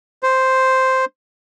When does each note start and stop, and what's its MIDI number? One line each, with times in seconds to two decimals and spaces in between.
0.23 1.05 72